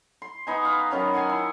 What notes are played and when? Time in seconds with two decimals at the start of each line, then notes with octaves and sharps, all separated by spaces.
0.22 C6
0.47 B3 D#4 G#5
0.65 B4 F5
0.91 D#3 F#3 C#4 A#5
1.14 F#5 G#5 C6
1.29 E4